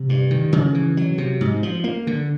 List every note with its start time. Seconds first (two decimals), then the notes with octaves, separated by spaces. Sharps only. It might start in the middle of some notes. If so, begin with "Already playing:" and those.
Already playing: C3
0.09 G2
0.31 D#3
0.53 C#3
0.75 E3
0.97 F#3
1.18 C3
1.41 G#2
1.63 F3
1.84 A#3
2.07 D3